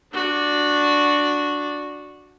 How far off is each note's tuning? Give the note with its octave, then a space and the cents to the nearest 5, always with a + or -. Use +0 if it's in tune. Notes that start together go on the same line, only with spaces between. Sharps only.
D4 +0 F#4 -10